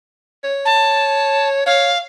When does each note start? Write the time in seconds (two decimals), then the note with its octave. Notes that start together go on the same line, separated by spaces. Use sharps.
0.44 C#5
0.65 A5
1.66 C#5 F5